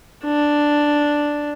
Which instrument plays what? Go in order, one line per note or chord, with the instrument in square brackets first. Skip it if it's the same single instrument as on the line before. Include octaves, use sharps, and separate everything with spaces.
[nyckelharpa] D4